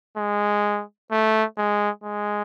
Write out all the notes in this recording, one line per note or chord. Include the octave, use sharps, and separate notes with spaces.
G#3
A3
G#3
G#3